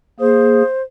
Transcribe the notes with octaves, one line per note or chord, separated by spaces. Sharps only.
A#3 G#4 C5